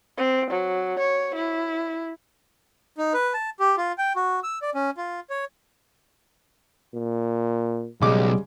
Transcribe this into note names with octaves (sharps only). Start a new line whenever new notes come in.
C4
F#3
C#5
E4
D#4
B4
A5
G4
F4
G5
F#4
E6
D5
C#4
F4
C#5
A#2
B1 C#3 G3 G#3 D6